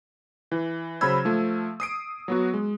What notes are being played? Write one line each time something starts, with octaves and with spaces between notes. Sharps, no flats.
E3
C#3 F#3 C5 B5 E6 G#6
F3 A3
D#6 C7 D7
F#3 B3 F#4
G#3